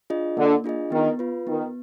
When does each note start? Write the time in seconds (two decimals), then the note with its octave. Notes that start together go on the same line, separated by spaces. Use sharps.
0.10 D4 F4 G#4 D#5
0.37 D3 A#3
0.64 D4 F4 G#4 D#5
0.92 D#3 B3
1.19 F4 B4
1.47 D#3 B3